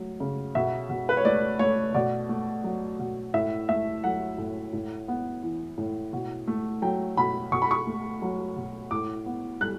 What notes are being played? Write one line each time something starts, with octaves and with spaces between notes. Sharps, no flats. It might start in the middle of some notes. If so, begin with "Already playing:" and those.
Already playing: F#3 A3
C#3
B2 E5
B2
B4
C#5
A3 D5
A3 C#5
B2 D5
A3
F#3
B2
A2 E5
A3 E5
F#3 F#5
A2
A2
B3
E3
A2
B2
A3
F#3 G5
B2 B5
B2 C#6
B5
C#6
A3
F#3
B2
A2 D6
B3
G3 F#6